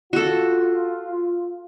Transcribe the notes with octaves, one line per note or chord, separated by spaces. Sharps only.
F4 F#4 A4